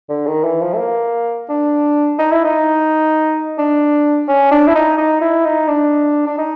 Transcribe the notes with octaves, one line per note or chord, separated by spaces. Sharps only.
D3
D#3
E3
F3
A3
A#3
D4
D#4
E4
D#4
D4
C#4
D4
E4
D#4
D#4
E4
D#4
D4
D4
D#4